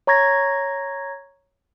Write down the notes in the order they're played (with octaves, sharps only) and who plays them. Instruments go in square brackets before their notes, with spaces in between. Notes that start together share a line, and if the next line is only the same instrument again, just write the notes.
[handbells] C#5 A#5 C#6 G#6 A#6